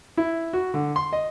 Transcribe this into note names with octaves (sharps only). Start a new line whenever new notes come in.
E4
F#4
D3
C6
D#5